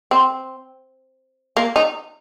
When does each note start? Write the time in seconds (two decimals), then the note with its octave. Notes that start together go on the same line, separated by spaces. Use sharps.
0.11 C4
1.57 A#3
1.76 D#4